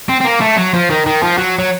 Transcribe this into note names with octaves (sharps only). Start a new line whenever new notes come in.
C4
C4
A#3
A3
F#3
F3
D#3
D#3
F3
F#3
F#3